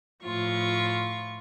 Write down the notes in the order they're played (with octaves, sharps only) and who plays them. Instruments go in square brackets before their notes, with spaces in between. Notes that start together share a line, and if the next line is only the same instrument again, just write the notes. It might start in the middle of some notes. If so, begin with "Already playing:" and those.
[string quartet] A2 F3 F4 C#6